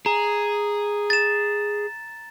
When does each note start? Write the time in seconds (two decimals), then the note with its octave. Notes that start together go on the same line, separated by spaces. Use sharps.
0.06 G#4 A#5
1.10 A6 E7